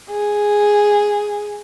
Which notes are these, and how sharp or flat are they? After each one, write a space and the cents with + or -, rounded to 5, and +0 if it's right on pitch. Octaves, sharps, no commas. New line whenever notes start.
G#4 -5